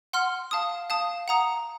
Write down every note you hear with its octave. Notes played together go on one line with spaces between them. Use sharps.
F#5 C6 F6
F5 A5 D#6
F5 A5 D#6
F#5 A#5 D#6